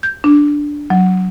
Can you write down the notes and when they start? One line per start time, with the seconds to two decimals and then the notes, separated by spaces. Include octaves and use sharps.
0.03 G6
0.24 D4
0.90 F#3